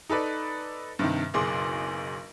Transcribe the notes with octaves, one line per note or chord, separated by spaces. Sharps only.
D#4 A4 B4 D5
G2 C3 D#3
F#1 B1 G#4 C6 D6